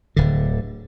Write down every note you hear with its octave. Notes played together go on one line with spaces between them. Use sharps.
D1 D3